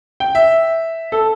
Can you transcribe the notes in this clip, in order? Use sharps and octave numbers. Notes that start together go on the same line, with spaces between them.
G5
E5
A4